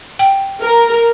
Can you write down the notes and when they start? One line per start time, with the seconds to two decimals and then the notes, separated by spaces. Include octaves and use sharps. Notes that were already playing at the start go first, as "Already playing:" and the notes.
0.19 G5
0.61 A#4